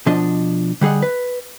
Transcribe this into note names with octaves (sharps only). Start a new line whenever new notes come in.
B2 F3 D4 D#5
D3 G3 G#4 D#5 F#5
B4